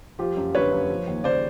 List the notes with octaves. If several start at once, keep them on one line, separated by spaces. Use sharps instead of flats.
F3 F4 G4
F#2
D3 B4 C#5
F#2
F3
D#2
C#3 C5 D5